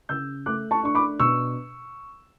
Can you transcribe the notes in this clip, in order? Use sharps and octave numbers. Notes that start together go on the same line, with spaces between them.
C#3 E6 G6
A3 D6 F#6
A5 C#6
D4 C#6
B5 D6
B2 C#6 E6